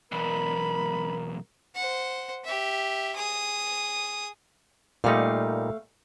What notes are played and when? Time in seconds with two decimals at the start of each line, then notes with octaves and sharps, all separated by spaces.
0.12 B1 E2 A#4 B5
1.75 C5 F#5
2.44 G4 E5
3.15 G#4 D#6
5.04 A#2 G3 A3 D#4 F5